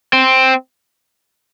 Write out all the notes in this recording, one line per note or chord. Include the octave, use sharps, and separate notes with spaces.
C4